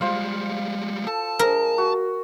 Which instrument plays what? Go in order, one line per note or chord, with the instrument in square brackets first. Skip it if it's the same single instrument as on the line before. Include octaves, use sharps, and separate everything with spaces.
[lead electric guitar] G3 G#3 [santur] F4 C5 F5
[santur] A4 [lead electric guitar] A5
[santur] G#3 [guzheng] A#4
[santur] F#4